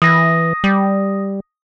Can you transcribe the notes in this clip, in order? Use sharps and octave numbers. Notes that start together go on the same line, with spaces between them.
E3 D#6 A#6
G3